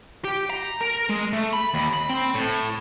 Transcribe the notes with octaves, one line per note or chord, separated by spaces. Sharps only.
G4
A#5
A#4
G#3
A3
B5
D#2
B5
C4
A2